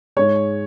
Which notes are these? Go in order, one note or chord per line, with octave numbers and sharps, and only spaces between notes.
G#2 G#3 C#5